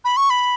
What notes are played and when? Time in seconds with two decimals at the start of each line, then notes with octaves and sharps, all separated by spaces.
0.05 B5
0.17 C#6
0.30 B5